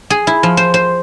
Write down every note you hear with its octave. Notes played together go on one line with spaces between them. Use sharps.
G#4
E4
F3
C5
C5